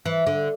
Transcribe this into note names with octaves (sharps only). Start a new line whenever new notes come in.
E3
D3